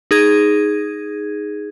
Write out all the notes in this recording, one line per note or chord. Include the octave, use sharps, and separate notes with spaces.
D#4 G#4 G#6